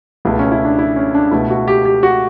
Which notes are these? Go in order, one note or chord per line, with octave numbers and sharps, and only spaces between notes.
C#2 B2 A3 E4
C#4
E4
D4
E4
C#4
D4
C#2 B2 A3 E4
F#4
G4
G4
F#4